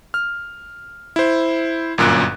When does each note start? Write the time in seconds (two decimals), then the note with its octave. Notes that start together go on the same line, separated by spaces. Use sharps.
0.14 F6
1.16 E4 C5
1.98 G1 F#2 A#2 F#6 D7